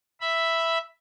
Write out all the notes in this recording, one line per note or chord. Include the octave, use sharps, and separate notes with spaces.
E5 B5